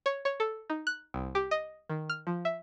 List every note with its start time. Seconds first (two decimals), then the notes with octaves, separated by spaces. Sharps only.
0.06 C#5
0.25 C#5
0.40 A4
0.70 D#4
0.87 F#6
1.14 C2
1.35 G4
1.51 D#5
1.90 D#3
2.10 F6
2.27 F3
2.45 E5